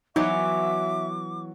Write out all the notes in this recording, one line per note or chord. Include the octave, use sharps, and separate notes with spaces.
E3 F#3 B3 D#4 E5 D6